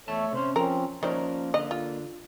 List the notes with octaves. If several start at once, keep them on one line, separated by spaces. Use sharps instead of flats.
E2 A3 A4 C#5 E5 A5
C3 C#4 C5
F3 C4 C#4 A#4
D#3 F3 A#3 C#4 A#4 C5 D5
D3 D#5
F4